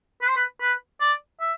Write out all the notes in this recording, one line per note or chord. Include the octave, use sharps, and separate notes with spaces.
B4
C5
B4
B4
D5
E5